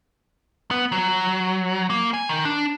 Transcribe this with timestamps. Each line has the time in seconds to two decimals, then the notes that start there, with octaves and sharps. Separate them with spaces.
0.71 B3
0.92 F#3
1.90 A#3
2.14 G#5
2.29 D#3
2.45 D4